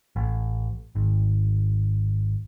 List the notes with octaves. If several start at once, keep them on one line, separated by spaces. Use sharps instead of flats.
A1
G#1